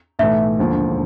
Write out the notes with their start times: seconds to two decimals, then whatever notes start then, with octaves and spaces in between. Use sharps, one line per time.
0.19 B1 A2 E3 A3 E5
0.59 E1 D#2 D3 F3